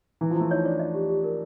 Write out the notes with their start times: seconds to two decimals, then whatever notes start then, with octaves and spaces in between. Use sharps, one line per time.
0.21 E3 E4
0.31 F3
0.36 A3 E4
0.51 D#4 C#5
0.65 D4 C#5
0.79 D#5
0.94 G4
1.09 G4
1.24 A#4